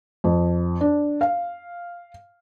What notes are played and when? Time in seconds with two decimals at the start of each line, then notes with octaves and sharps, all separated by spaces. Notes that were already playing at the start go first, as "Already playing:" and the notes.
0.24 F2
0.81 D4
1.21 F5